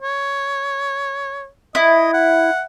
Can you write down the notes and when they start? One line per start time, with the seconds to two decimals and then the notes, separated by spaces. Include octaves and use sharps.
0.02 C#5
1.75 E4 D#5
2.14 F#5